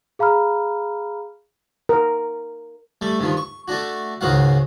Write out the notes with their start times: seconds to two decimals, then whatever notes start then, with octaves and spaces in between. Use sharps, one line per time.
0.19 G#4 F5 A#5 B5 F6
1.89 A#4
3.01 G3 A3
3.20 G2 D#3 F3
3.37 C#6
3.68 A3 D4 F#4
4.21 C#2 G#2 D#3 F#4 F5 F#5